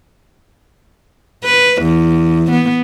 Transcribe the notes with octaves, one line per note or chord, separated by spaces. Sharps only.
B4
E2
B3